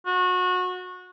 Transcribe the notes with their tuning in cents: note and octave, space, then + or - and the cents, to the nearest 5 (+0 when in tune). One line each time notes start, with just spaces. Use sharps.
F#4 -25